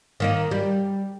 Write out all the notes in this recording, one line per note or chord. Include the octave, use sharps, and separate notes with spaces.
D#3 A#3 D#4
G3